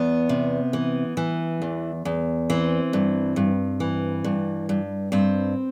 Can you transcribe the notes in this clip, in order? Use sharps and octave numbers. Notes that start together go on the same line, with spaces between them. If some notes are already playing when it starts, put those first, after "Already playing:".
Already playing: E2 B3
C3
E3
E3
E2
E2
E3 C4
G2
G2
E3
G2
G2
G2 C4